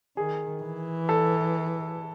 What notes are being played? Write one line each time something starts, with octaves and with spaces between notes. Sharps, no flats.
D#3 G#4
E3
A4